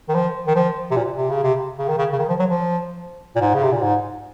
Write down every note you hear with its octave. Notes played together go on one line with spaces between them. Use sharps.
D#3
F3
D#3
F3
C3
A#2
C3
C#3
C3
C#3
D#3
C#3
C#3
D#3
F3
F#3
F3
A#2
G#2
C#3
C3
A#2
G#2